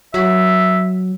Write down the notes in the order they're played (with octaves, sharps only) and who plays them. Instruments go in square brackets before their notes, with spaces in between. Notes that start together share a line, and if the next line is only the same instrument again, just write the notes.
[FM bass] F#3 [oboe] E5